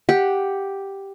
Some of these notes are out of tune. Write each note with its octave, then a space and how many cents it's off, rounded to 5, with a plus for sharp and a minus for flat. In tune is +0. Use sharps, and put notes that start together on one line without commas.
G4 +0 F#5 +0